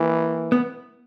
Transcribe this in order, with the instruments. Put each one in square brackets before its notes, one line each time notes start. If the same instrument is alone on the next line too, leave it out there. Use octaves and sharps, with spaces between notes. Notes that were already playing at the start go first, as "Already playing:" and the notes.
Already playing: [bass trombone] E3 [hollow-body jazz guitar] A#3
[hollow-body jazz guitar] B3